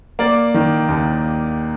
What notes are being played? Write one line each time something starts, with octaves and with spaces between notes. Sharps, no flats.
A#3 D5
D#3
D#2